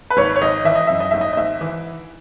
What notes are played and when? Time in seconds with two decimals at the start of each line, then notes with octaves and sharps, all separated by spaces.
0.10 B4
0.17 G#1 C#5
0.36 C#5
0.42 G#1 D#5
0.65 E3 E5
0.75 D#5
0.87 F#2 E5
1.00 D#5
1.11 G#1 E5
1.21 D#5
1.33 D#5
1.37 G#1 E5
1.61 E3